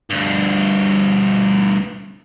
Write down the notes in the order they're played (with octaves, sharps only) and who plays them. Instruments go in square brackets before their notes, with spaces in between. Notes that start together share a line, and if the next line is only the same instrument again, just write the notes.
[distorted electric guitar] D2 G2